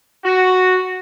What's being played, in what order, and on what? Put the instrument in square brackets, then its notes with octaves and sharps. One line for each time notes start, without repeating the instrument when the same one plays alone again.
[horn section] F#4